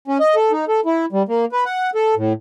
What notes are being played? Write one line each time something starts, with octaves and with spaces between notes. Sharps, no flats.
C#4
D#5
A4
D#4
A4
E4
G3
A#3
B4
F#5
A4
A2